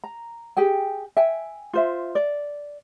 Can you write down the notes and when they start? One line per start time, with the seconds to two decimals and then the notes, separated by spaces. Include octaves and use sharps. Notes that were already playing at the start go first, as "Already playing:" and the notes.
0.04 A#5
0.57 G4 G#4 G5 G#5
1.17 E5 G5 G#5
1.73 F4 C5 E5
2.15 D5